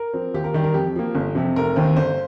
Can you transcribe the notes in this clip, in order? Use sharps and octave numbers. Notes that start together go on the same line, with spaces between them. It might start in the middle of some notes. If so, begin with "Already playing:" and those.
Already playing: A#4
F3 C4
D#2 G4
A#4
D#3 G3 G4
A#4
F2 G4
F3 A#3
G1
F2 C3
F1 A#4
D#2 D#3 C4
G1 C5